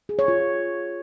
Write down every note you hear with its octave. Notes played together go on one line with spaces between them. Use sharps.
G#4
C#5
F4